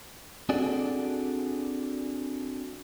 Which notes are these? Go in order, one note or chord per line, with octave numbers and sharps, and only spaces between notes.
C4 D4 F#4 G#4 A4 D5